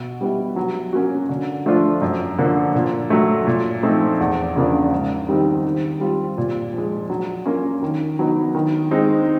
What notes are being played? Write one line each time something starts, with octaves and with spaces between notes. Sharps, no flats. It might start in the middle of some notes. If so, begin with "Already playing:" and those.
Already playing: B2
G3 B3 E4
F#3
A#3 C#4 F#4
D3
F3 A3 D4 F4
F#2
D3 F3 A#3
A#2
F#3 A3
A#2
F3 A3 C4 D#4
E2
C#3 F3 A#3 D4
G#2
D#3 G3 C4 D#4
D#3
G3 C4 F4
A#2
F3
G#3
F#3
A#3 C#4 F4 A#4
D#3
F#3 B3 D#4
D#3
G#3 C4 D#4